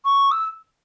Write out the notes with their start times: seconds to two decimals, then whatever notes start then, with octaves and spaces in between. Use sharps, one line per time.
0.05 C#6
0.31 E6